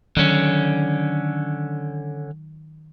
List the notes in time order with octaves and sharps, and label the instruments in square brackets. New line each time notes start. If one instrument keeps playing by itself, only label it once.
[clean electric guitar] D3 C#4 [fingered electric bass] D#3 F#3